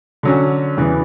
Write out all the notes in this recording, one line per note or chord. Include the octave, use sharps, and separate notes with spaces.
D3 F#3 C#4
E2 C#3 E3 B3